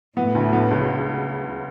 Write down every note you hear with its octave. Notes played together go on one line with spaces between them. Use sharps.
A2 B3
D2
B3
C#2